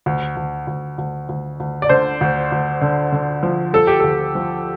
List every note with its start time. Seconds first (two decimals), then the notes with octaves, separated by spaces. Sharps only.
0.06 D2
0.36 D2
0.67 D2
0.98 D2
1.29 D2
1.60 D2
1.82 D5
1.89 D3 C5
2.21 D2
2.52 D2
2.81 D3
3.12 D3
3.43 F3
3.73 F3 A4
3.87 G4
4.00 D2 A4
4.35 F3